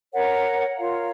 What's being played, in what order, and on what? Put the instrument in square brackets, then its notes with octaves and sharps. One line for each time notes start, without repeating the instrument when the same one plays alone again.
[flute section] A#4 C#5 F#5
F4 A#4 C#5 F5